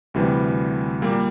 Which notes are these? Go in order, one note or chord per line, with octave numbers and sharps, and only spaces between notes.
D2 C3 E3 G3
A#2 G3 A#3